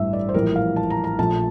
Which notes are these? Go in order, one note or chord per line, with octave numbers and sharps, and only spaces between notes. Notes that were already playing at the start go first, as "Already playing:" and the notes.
Already playing: A1 G2 E3 E5
D5
C5
A#1 A2 E3 G3 A#4
F5
A5
A#5
A#5
A#1 A#2 F3 A3 A5